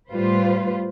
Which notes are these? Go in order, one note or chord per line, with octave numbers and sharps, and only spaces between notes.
A2 G3 F4 B4 C5